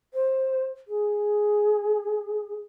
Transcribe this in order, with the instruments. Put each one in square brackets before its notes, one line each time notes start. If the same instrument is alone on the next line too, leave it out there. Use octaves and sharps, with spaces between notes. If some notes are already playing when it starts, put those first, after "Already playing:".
[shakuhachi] C5
G#4